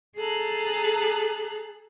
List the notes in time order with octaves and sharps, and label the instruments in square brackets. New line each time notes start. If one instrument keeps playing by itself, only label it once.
[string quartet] G#4 A4 A#5 F#6